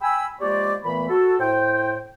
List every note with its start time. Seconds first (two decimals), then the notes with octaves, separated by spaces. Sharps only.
0.01 G5 G#5 B5 E6
0.41 F3 G#3 A#3 G4 C#5 D5
0.83 A#2 E3 A3 B3 B5
1.09 F#4 A4
1.39 A2 C5 G5